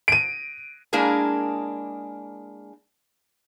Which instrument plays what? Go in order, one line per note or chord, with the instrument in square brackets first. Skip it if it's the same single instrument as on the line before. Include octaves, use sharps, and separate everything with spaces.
[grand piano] D7 D#7
[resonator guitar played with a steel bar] G#3 A#3 D4 E4 G#4 A#4